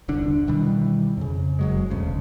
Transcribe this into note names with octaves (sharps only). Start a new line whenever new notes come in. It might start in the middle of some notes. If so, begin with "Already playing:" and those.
D#1 C2 D3 D4
B2 D#3 E3 G3
F2 C#3
F#1 F#3 G#3
E1 D2 C#3